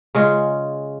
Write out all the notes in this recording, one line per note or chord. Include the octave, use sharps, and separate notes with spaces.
C#3 G#3 F4